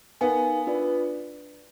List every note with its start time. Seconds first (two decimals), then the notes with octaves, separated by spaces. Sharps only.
0.21 B3 D#4 A#4 F5 G#5
0.67 D4 F4 B4 D5